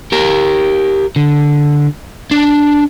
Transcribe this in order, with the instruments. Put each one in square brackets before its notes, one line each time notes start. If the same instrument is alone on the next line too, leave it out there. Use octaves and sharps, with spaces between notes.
[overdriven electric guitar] G4 A#4
D3
D4